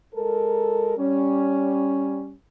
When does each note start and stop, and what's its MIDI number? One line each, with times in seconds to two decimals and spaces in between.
0.15 0.97 56
0.15 0.97 69
0.15 0.97 70
0.98 2.33 55
0.98 2.33 61